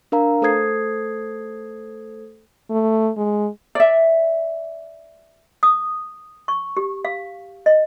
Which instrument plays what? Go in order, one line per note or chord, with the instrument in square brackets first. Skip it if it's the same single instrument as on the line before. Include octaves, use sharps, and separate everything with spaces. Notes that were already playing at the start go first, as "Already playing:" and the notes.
[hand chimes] D4 A#4 F5 A#5
A3 A4 C5 D#6 G#6 C7
[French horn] A3
G#3
[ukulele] D5 E5
[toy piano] D#6
C#6
G4
F5
D#5